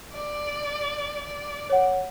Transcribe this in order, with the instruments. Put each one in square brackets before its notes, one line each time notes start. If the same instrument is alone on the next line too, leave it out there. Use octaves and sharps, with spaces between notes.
[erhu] D5
D5
[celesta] C#5 F#5